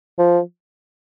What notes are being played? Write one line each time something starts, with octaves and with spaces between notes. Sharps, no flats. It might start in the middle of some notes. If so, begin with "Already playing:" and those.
F3